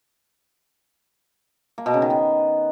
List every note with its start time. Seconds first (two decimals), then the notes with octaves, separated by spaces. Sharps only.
1.78 A#3
1.86 B2
1.94 C#3
2.02 D#3
2.10 B3